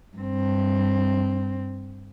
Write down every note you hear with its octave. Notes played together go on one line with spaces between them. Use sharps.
G2 C4